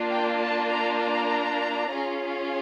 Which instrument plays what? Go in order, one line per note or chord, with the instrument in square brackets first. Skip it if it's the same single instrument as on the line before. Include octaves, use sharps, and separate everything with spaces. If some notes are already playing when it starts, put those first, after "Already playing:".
Already playing: [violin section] A#3 D4 F4
G5
A5
A#5
A#5
C#4 F4 G#4